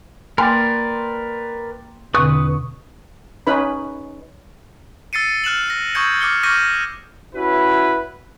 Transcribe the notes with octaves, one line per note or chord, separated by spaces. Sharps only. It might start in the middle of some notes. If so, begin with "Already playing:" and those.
A#3 A#4 B4 D5 G5 G#5 C6 F6
E2 B2 D3 C4 B4 C#6 D#6 F#6
C#4 D#4 B4 B5
E6 A6 C7 C#7 D#7
F6 F#6 E7 F#7
A#6
C#6 D#6 E6 G6 G#6 C#7
D6 F6 C#7 G7
C#6 D6 F6 G6 A#6 D#7
C#4 E4 F#4 B4